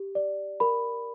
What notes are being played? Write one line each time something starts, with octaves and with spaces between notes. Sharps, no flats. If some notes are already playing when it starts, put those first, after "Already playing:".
Already playing: G4
D5
A#4 B5